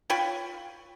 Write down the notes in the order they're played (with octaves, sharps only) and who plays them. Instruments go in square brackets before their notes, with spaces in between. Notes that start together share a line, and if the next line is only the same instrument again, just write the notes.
[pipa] F4 C#5 G5 B5